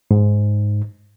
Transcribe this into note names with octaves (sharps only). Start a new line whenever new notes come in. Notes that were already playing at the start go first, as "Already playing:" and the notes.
G#2